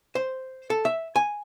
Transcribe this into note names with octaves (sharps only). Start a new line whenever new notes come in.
C5
A4
E5
G#5